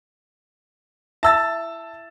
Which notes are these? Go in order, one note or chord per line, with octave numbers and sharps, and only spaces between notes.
E4 E5 A5 E6 A6